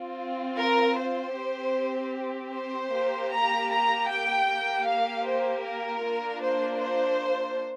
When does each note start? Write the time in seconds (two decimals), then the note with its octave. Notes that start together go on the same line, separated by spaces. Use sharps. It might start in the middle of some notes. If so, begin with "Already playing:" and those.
Already playing: C4 F4
0.58 A#4
0.98 C5
1.37 C4 G4
2.53 C5
2.92 A#3 G4
3.32 A#5
3.70 A#5
4.09 G5
4.48 A#3 G4
4.86 F5
5.26 C5
5.65 A#4
6.03 A#3 D4 F4
6.43 C5
6.81 C5